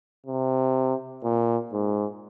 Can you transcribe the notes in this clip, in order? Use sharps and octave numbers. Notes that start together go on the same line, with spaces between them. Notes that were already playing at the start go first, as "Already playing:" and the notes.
C3
A#2
G#2